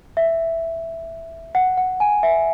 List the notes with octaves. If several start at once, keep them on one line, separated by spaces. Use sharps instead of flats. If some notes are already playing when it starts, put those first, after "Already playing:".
E5
F#5
F#5
G#5
E5